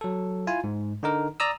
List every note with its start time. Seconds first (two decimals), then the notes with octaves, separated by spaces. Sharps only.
0.01 F#3 A4
0.47 E4 F4 G#5
0.64 G#2
1.03 D3 D#4 A#4
1.40 D5 A#5 D#6 E6